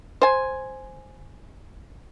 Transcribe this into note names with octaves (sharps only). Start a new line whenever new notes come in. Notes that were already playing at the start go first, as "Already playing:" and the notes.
C5 G#5